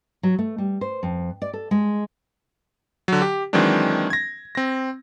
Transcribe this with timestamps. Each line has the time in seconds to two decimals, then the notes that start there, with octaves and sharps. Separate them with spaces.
0.23 F#3
0.39 A3
0.58 G3
0.81 C5
1.03 F2
1.42 D5
1.53 A4
1.71 G#3
3.08 D3 F#3
3.22 G4
3.53 D#3 E3 F#3 G#3 C4 D4
4.10 G#6 A#6
4.55 C4 A#6